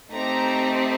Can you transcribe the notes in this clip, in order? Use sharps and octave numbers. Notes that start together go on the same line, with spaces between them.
A3 C4 D#4 G4 A#5